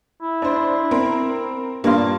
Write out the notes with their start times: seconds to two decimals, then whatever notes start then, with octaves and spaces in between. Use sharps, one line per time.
0.22 E4
0.42 D4 C5
0.91 C4 A#4
1.84 G2 A#2 A#3 F4